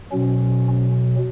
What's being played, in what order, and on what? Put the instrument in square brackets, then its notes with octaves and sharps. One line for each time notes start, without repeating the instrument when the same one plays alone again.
[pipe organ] B2 F#3 C#4